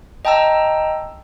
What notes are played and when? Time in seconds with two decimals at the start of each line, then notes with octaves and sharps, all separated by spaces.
0.25 D#5 G5 A5 A#5 E6